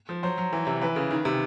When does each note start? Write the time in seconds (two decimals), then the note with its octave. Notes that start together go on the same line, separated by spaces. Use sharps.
0.09 F3
0.23 F#3 C5
0.38 F#3
0.53 E3
0.67 C3
0.81 E3 B4
0.96 C#3
1.11 D#3
1.25 C3